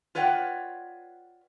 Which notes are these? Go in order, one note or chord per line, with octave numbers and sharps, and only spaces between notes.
F4 B4 C#5 D5 F#5 G5